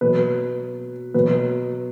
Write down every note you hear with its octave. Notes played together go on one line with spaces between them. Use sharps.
B2 F#3 B4
B2 F#3 B4